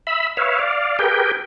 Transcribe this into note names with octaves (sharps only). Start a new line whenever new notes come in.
E5 B5
B4 C#5 E5 F5
D5 F5
G4 G#4 A#4 B4 G5